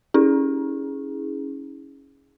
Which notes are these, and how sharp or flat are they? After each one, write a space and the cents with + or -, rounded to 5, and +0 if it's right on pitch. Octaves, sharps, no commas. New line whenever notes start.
C#4 +0 E4 -40 G#4 +0